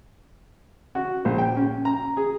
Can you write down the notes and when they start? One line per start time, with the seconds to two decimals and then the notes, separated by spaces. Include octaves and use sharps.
0.95 F#4
1.25 A#1
1.38 G5
1.56 C#4
1.85 A#5
2.17 G#4